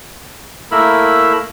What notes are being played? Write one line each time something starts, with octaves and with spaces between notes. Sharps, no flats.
A3 A#3 E4 A#4 B5 E6